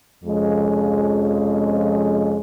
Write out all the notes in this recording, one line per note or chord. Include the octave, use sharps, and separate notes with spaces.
F2 C3 F3 G#3 C#4